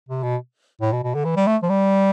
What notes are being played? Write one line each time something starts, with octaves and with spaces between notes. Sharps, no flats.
C3
B2
A2
B2
B2
D3
E3
G3
A3
F3
G3